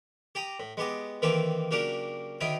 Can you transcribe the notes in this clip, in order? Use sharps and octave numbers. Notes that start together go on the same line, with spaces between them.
G4 G5 A#5 D#6
A2
G#3 B3 G4 D#5
D#3 E3 A#3 C4 G4 A4
C#3 F#3 A#3 D4 G4 A#4
D2 D#3 D#4 E4 G5 D#6